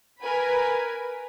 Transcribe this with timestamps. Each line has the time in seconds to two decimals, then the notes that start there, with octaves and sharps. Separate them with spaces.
0.21 A#4 B4 G#5 B5